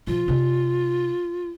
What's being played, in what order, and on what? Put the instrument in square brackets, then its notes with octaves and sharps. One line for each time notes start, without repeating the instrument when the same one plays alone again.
[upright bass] B2 F3 [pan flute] F4
[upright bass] C3 D#4